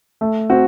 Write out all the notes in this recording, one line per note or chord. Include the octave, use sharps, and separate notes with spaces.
A3
C4 F#4